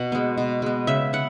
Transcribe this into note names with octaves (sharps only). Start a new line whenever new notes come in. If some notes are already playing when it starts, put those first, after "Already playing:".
Already playing: B2 F#5
G#3 B3
B2
G#3 B3
C#3 E5
B3 F#5